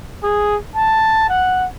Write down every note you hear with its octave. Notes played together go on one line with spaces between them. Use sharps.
G#4
A5
F#5